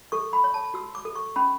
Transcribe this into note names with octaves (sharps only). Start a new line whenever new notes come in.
A4 C#6
B5
C#5
A5
F#4 E6
D6
A4
C#6
C#4 B5